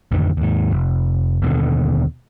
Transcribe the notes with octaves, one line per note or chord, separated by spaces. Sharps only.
A1 F2 D3 D#3
D#2 G#2
F1
D#2 B2 D3